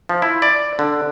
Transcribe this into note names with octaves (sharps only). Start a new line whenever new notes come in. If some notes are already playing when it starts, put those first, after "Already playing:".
F3
E4
D5
D3